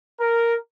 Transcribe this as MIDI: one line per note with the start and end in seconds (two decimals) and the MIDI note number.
0.21 0.56 70